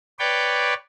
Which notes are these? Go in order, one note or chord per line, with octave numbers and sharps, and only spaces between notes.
B4 C#5 D5 G5